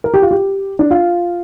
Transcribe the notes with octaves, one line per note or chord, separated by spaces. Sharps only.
A#4
G4
F4
G4
D4
F4